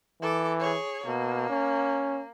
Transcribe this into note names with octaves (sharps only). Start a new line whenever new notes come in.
E3 A4 D6
G#4 C#5
B2 A#3
C#4